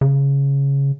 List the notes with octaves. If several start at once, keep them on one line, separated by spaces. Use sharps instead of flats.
C#3